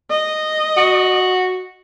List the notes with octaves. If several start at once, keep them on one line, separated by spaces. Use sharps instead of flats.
D#5
F#4